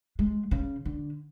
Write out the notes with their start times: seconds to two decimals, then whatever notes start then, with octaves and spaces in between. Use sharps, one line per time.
0.19 G#3
0.51 C#3
0.85 D3